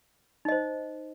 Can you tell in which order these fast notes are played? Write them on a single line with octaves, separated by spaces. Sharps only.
D#4 D#5 C5